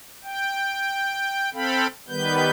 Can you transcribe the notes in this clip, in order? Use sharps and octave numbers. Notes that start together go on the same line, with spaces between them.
G5
C4 A4 F5 G5 B5
D#3 G3 B3 B4 G6